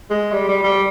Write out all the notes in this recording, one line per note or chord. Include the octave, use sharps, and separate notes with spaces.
G#3
G3
G3
G3